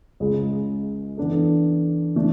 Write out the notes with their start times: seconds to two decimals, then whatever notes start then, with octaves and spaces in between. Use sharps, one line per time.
0.20 C#2 C#3 G#3
1.17 E3 B3 D4 A4
2.15 E3 A3 D4